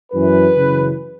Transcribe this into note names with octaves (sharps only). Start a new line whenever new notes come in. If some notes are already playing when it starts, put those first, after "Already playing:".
F#2 E3 B4
F#2 C#3 E3